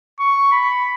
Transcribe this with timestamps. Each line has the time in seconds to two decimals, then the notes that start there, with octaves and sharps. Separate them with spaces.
0.19 C#6
0.52 B5